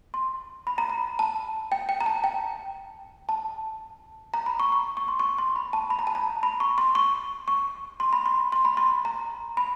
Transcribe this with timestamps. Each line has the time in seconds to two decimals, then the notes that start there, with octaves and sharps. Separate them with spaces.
0.14 C6
0.67 B5
0.78 A#5
0.90 B5
1.19 A5
1.72 G5
1.89 G5
2.01 A#5
2.06 A5
2.24 G5
3.29 A5
4.34 A#5
4.46 B5
4.60 C#6
4.72 C#6
4.97 C#6
5.08 C6
5.20 C#6
5.38 C6
5.56 B5
5.73 A5
5.90 B5
5.99 A#5
6.07 A5
6.15 A#5
6.43 B5
6.60 C#6
6.78 C6
6.95 C#6
7.48 C#6
8.00 C6
8.13 B5
8.26 C6
8.52 C6
8.65 B5
8.77 C6
9.05 A#5
9.57 B5